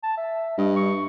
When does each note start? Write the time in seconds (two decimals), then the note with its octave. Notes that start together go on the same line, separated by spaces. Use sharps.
0.03 A5
0.17 E5
0.58 G2 D#5
0.76 C#6